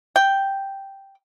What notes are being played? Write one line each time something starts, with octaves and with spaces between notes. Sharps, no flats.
G5